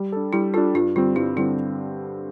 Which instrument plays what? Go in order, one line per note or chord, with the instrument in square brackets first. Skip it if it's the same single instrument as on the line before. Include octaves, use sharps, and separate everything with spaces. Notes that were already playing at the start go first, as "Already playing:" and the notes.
Already playing: [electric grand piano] G3
D4 A4
[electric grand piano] G3 [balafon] E4
[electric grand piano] D4 A4 [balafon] F4
[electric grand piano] G2 [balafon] F4
[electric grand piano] D3 G3 C4 [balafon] F4
[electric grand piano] G2 [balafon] E4
[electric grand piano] D3 G3 C4 [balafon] E4